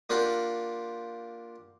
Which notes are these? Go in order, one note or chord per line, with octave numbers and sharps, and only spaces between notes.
A#3 D4 F4 G4 A#4 F#5